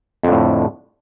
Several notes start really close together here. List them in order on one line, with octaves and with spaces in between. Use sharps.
F2 D3 A2